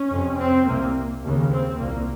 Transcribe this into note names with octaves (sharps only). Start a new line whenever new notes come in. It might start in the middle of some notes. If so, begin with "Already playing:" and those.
Already playing: C#4
F2 C3
C4
C2 C3 A#3
D#2 C#3
C4
C2 A#2 A#3